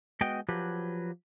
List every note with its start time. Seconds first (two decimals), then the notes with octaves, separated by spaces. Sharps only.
0.21 G#3 B3 F#4 D#5 G5
0.49 F3 F#3 G4 B4